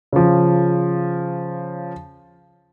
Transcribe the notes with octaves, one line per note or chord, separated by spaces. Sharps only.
C#3 F3